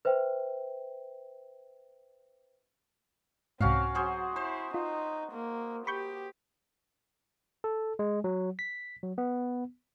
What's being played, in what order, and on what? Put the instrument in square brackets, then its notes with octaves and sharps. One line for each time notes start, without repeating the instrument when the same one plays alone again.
[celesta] B4 C5 E5 G5
[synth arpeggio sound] C2 G#2 [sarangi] C4 [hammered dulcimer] C#4 F#4 F5
[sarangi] F#3 [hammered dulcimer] F#4 G#4 C5
[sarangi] E4 [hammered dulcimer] C5
[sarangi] D#4 [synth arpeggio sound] F4
[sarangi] A#3
[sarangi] G4 [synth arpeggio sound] B5 C#6 G6
[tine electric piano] A4
G#3
F#3
B6
F#3
B3